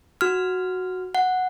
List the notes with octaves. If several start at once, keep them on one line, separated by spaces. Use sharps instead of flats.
F#4 F6
F#5